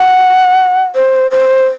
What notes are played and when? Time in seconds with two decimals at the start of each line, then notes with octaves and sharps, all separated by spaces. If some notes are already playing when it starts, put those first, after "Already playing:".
Already playing: F#5
0.95 C5
1.31 C5